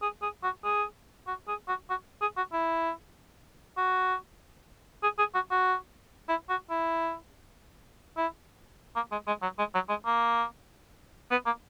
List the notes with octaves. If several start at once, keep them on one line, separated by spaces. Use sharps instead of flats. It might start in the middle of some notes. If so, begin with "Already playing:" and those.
G#4
G#4
F#4
G#4
F#4
G#4
F#4
F#4
G#4
F#4
E4
F#4
G#4
G#4
F#4
F#4
E4
F#4
E4
E4
A#3
G#3
G#3
F#3
G#3
F#3
G#3
A#3
B3
A#3